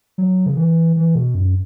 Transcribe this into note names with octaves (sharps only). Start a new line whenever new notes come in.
F#3
C#3
E3
E3
B2
F#2